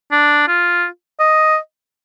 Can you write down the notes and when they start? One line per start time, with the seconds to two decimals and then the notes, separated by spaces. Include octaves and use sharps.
0.12 D4
0.48 F4
1.20 D#5